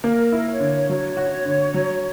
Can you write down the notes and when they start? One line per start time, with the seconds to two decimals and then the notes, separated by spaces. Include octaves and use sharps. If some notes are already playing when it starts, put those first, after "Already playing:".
0.04 A#3 A#4
0.32 E4
0.47 C#5
0.60 D3
0.89 F#3 C#5
1.17 F#4
1.45 D3
1.74 F#3